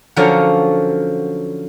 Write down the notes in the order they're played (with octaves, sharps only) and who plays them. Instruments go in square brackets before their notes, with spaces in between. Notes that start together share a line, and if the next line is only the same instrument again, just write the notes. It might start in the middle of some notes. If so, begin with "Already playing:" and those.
[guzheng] D3 F3 F#3 C#4 A#4 D5